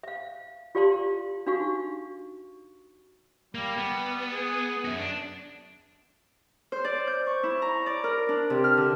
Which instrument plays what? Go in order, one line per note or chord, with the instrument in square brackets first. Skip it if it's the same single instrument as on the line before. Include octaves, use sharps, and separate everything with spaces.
[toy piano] E5 F5
F4 G4 D5 F5 A5 C6
D4 D#4 F#4 F5 C#6
[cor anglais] G3 [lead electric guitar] A#3
[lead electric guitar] B3
[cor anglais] G#4
[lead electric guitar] F#2 F#4
D4
[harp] C5
D5
G6
C#6
E4
A#5
D5
A#4
D4
C3
F6
D3